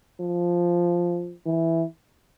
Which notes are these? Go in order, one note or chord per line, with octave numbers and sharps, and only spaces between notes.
F3
E3